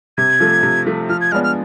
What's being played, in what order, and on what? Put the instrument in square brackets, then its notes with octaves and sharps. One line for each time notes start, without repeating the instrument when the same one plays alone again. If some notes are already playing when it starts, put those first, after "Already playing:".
[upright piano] C3 [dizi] G#6
[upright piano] F3 A3
C3
F3 A3
[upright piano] F3 [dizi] F6
[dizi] G#6
[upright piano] G#3 B3 D4 [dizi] F6
[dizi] F6